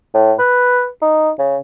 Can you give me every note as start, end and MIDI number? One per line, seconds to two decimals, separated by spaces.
0.14 0.33 45
0.39 0.88 71
1.02 1.30 63
1.39 1.57 49